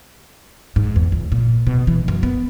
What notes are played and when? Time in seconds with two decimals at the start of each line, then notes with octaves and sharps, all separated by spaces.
0.76 G#2
0.96 E2
1.12 C#2
1.32 A#2
1.67 B2
1.87 E3
2.08 F#2
2.23 B3